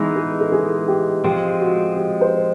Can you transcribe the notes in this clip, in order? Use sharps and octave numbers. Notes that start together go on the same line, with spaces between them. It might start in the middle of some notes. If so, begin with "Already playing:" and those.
Already playing: E3 G#3 B3 D#4 G#4
G#4
A4
G#4
G4
F3 G#3 C4 G4
F#4
G4
C5